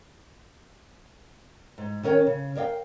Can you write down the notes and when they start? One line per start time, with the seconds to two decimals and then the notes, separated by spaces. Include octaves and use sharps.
1.78 G#2
2.03 D#3 C#4 A#4 C#5 G5
2.27 C#3
2.55 A#4 C#5 D5 F5 G5